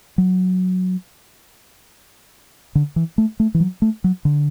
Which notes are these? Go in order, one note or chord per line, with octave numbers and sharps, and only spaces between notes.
F#3
D3
E3
A3
A3
E3
F#3
A3
F#3
D3